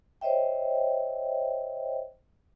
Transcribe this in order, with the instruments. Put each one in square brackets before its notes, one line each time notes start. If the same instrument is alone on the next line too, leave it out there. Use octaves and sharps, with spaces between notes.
[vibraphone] C5 C#5 D#5 E5 G5